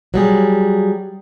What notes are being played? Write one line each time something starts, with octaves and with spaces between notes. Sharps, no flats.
F#3 G3 G#4